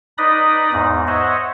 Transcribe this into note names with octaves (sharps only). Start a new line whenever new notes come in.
D#4 B4 D5 D#5 B5 D#6
E2 G#2 D#4
C5 C#5 D#5 E5 F#5